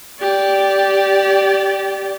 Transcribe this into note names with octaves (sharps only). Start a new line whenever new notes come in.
G4 D5